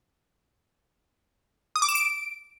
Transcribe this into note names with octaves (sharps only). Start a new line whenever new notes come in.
D#6
D6
E7
D7